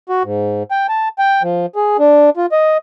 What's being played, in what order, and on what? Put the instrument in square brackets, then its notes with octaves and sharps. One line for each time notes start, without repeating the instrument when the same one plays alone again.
[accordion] F#4
G#2
G5
A5
G5
F3
G#4
D4
F4
D#5